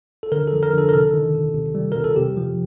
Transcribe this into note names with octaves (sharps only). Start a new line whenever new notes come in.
A4
D3 A#4
A4
F3
A#4
D3 A4
A#4
C3 A4
D#3
C3
C3
G3
C3 A#4
A4
C3 G4
F3